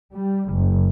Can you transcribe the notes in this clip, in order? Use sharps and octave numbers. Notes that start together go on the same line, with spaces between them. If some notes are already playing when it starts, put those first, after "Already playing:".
G3
F#1